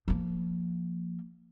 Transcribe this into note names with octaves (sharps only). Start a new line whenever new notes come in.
F3 A#3